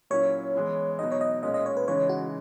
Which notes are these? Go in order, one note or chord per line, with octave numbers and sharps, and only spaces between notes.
A#2 F#3 C#4 E4 C#5
E3 G#3 B3 E4
B2 F#3 B3 D#4 D#5
C#5
D#5
A#2 G#3 C#4 D#5
D#5
C#5
B4
C#3 E3 G#3 D#4 C#5
F#4